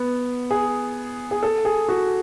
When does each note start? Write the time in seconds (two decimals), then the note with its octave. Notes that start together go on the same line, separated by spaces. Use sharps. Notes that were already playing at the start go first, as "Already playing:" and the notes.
Already playing: B3
0.51 G#4
1.31 G#4
1.43 A4
1.65 G#4
1.89 F#4